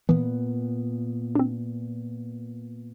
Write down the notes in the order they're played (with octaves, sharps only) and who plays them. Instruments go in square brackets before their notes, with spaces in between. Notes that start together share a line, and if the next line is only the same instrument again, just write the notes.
[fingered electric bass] A#2 B3 [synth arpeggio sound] E3
[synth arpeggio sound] C4 D4